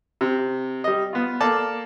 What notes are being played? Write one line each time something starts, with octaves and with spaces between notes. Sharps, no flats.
C3
G3 D#5
B3 F4
A#3 A4 D5 A5 D6